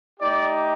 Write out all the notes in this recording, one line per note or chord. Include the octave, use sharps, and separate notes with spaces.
A3 D#4 G4 D5